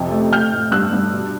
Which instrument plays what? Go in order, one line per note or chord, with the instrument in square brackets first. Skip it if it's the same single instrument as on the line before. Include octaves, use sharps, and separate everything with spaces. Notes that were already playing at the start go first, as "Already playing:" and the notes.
Already playing: [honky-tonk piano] F2 C3
A3
A3 F6 G6
A2
G2 E6 F#6
G2
B2